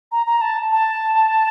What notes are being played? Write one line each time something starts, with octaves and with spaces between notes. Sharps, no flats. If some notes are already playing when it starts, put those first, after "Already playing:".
A#5
A#5
A5
A5